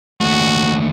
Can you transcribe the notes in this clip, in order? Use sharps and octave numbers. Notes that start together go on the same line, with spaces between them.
D#2 A3 F#4